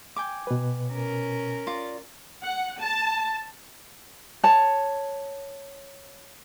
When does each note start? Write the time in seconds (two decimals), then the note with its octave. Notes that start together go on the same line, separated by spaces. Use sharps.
0.16 G5 G#5 D6
0.47 B2 B4
0.89 C#4 A#4
1.67 F4 D5
2.42 F#5
2.79 A5
4.43 C#5 A5